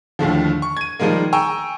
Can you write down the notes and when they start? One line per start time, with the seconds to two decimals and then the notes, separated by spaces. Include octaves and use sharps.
0.19 D#2 A2 D3 F3
0.62 C#6
0.77 G#6 D#7
1.00 D#3 F3 G3 G#3 A#3
1.33 G5 G#5 A#5 C#6 E6